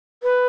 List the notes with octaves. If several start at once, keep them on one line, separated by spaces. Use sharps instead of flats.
B4